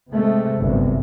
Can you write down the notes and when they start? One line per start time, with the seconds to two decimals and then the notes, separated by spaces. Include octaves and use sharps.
0.11 C3 G#3 A3
0.59 G1 C2 F#2 C3